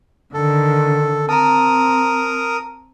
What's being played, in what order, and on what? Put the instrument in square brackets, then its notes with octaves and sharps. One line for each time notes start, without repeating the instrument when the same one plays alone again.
[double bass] D3 D#3 [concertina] A4
[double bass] C4 [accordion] A#4 [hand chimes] A5 A#5 [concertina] D#6